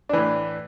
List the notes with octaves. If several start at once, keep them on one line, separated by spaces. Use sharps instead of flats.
A2 E3 D4